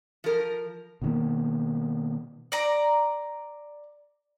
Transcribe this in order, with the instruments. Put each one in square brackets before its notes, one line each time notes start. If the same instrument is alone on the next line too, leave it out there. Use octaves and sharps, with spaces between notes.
[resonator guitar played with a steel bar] F3 A#4
[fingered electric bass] B2 D#3 A#3
[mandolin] D5 A#5